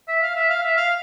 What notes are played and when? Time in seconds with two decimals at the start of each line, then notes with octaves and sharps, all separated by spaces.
0.08 E5
0.22 F5
0.36 E5
0.50 F5
0.63 E5
0.77 F5